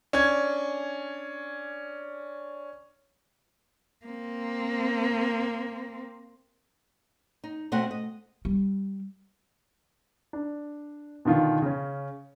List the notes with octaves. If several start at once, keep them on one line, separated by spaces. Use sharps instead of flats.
C#4 D4 G#6
A#3 C4
D#4
B2 A3 C4 D#5 F#5
D#5
G3
D4
B2 D3 D#3 F4
C#3 C#4